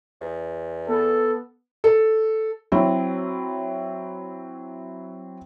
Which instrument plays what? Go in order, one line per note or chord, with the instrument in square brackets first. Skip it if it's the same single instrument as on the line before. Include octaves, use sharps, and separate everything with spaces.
[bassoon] E2
[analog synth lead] B3 [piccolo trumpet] A4
[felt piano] A4
F#3 C4 E4